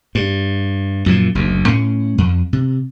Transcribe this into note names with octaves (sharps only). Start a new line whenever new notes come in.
G2
F#2 A#2 E3 F3
F#1 D2
A2 C#4
F2
C3